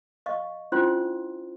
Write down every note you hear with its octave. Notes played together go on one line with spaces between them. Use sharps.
D#5 F5 C#6
C#4 D4 E4 F4 C5 C6